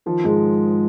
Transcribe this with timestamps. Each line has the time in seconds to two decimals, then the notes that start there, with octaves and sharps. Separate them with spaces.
0.06 D#3 F3
0.24 G#2 G#3